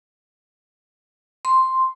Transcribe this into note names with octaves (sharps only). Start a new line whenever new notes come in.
C6